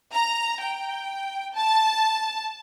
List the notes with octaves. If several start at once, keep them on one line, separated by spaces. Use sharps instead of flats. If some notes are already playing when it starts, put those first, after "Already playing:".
A#5
G5
A5